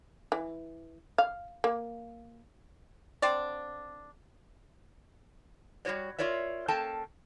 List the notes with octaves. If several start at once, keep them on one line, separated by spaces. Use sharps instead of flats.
E3
F5
A#3
D3 C4 D4 D5
G3 G#3 F#4 C#5 D5
F4 A#4 C#5 D5 E5
A#3 C#4 A4 G5 A5